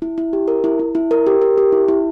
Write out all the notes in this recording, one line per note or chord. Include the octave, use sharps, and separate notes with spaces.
E4
E4
G4
A#4
E4
E4
E4
A#4
G4
A#4
G4
E4
E4